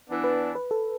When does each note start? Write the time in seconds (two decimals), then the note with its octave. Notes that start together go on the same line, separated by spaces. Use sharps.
0.08 E3 B3 D4
0.24 B4
0.55 B4
0.71 A4